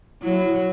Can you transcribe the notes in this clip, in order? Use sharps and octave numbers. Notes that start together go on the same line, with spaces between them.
F#3 E4